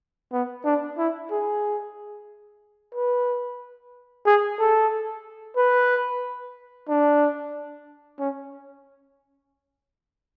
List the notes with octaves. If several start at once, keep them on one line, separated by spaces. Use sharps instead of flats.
B3
D4
E4
G#4
B4
G#4
A4
B4
D4
C#4